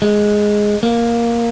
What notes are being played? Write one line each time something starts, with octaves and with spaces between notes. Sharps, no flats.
G#3
A#3